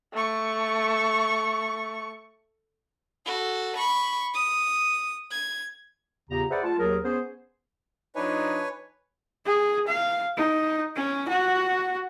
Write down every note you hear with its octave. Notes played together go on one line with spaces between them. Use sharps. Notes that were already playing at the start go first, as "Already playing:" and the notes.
A3 C#6
F#4 A4
B5 C#6
D#6
G#6
E2 A#2 C#3 G4 A#5
G#4 B4 C5 D5 E5 F#5
A3 F4 A5
D#2 F#3 G#4 A#4
B3 C#4 G#4 C5
F3 D4 D#4 B4 C#5 G#5
G#4
F5
D#4
C#4
F#4